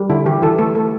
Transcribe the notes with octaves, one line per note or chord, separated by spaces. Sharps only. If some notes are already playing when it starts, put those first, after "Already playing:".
Already playing: G3
D3 E4
E3 G4
E3 A4
A3 A4
A3 A4